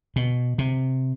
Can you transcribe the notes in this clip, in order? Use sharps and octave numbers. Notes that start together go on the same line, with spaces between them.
B2
C3